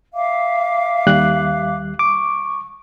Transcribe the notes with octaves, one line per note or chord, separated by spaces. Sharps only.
E5 F5 D6
D#2 G3 F#6
C#6 D6